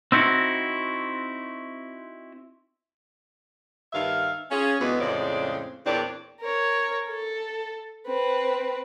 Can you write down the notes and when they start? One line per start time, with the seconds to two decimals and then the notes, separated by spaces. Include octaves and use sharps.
0.12 C4 D#4 E4 F#4
3.93 G2 D#3 E5 F5
4.51 C#4 F4 G#4
4.80 D2 E3 G#3 B3
5.00 F2 A2 C#3 G#3 C4 D5
5.86 E2 A#2 C4 D4 C#5 D5
6.41 A#4 C#5
7.08 A4
8.07 C4 B4